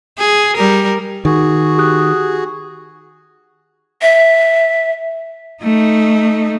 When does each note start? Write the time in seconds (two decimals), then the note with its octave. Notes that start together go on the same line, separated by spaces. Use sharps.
0.19 G#4
0.57 G3 A#4
1.25 D#3 F#4 G#4
1.78 G4 D#6 F#6
4.02 E5
5.63 A3 D#4